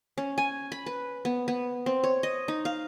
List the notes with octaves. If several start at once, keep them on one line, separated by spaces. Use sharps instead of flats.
C#4
G#5
B5
B4
B3
B3
C4
C#5
D#5
D#4
F5